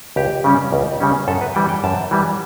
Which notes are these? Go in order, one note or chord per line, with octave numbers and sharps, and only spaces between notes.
C#2 G4
C#3 G3 C#4
C#2
C#3 G3 C#4
F#2 A4
B4
E3 G3 G5
G5
F#2 A5
E3 G3